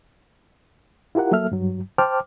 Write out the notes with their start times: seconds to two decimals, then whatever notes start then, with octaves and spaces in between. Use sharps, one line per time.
1.15 E4 F4 G4 A#4 F#5
1.31 F#3 A#3 A4 E5 F6
1.52 G2 F#3
1.98 C5 G5 A5 D6 F6